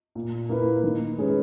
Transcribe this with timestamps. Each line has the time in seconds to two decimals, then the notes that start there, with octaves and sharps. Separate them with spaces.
0.15 A#2
0.49 A#3 E4 B4
0.84 D#3
1.18 G#3 C#4 G#4 B4